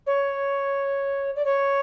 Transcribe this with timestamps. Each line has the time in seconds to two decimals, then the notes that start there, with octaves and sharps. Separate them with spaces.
0.06 C#5
1.35 D5
1.45 C#5